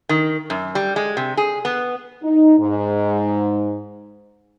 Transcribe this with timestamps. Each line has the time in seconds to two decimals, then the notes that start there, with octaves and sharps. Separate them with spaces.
0.09 D#3
0.50 F#2
0.75 G3
0.96 G#3
1.17 C3
1.37 G#4
1.65 B3
2.23 D#4
2.59 G#2